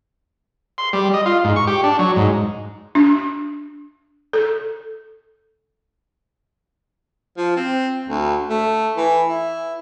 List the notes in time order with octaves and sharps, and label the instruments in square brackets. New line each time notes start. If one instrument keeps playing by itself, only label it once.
[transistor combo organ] C6
G3
D#5
F4
G#2
C#6
G4
D4
F#3
G#2
[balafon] D4
A4
[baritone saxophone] F3
C4
D2
A3
E3
E4